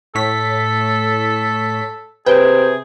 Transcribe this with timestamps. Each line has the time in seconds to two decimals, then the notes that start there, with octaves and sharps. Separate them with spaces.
0.15 A2 A4 C#5 B6
2.26 C3 G#4 B4 G5